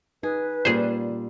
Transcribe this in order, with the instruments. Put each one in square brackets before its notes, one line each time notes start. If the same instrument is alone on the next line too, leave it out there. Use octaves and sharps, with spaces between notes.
[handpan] D#4 [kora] G#4 [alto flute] B4
[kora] A#2 G3 [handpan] A#3 C#4 [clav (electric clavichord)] G#4 C5